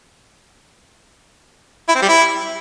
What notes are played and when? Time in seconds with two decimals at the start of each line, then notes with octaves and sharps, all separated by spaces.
1.89 E4
1.95 C4
2.02 G3
2.09 E4